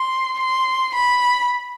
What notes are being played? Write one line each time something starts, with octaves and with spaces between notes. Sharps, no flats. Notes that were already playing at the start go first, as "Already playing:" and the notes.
Already playing: C6
C6
B5